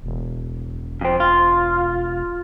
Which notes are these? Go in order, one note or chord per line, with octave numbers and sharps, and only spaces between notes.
E1
F2 C4
F4